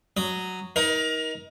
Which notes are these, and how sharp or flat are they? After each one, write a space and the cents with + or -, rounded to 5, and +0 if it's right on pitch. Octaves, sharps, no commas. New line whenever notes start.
F#3 +0 D#6 +0
D#4 +30 A#4 +25